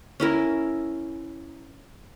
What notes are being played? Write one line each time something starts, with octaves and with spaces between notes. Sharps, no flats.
C#4 E4 A#4